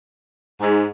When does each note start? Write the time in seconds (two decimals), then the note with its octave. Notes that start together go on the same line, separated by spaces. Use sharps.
0.60 G#2